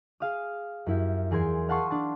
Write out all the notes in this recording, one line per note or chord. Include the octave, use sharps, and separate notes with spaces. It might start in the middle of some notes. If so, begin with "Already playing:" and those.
G#4 F5 D#6
F#2 E4 G4
E2 G#4 A#4 C6 G#6
F5 F#5 A5 C6 C#6 D#6
D4 A5